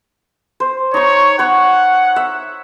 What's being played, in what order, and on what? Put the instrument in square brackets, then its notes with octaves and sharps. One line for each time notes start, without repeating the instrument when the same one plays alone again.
[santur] C5
[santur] D#4 C#6 [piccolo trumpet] C#5
[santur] C#5 C#6 [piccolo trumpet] F#5
[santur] E5